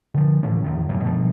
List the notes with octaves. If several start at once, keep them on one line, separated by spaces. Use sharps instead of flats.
D3 F3
A2 E3 F3 C#4
E2 D#3
A1 F#2 B2
B2 F3 G3